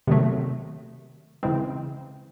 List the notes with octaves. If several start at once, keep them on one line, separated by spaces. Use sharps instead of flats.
C3 D#3 F#3 A3
C#3 E3 G#3 C4